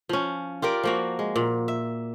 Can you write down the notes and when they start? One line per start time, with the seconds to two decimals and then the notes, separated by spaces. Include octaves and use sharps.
0.09 F3 C#4
0.62 F4 G4 A#4 D5
0.84 F3 A#3 F#4
1.19 G#3
1.36 A#2
1.68 E5